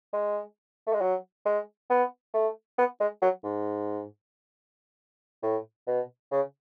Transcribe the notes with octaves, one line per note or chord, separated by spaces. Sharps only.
G#3
A3
G#3
F#3
G#3
B3
A3
B3
G#3
F#3
G#2
A2
B2
C#3